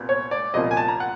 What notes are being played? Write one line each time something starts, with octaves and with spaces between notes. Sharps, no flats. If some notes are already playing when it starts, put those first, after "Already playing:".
Already playing: C2 A#2 B3
C#5
D5
C2 A#2 F3 D#5
G#5
A5
A#5
F#5